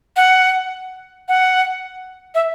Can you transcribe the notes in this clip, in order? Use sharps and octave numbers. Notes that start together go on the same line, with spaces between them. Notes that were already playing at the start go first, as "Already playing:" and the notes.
F#5
F#5
E5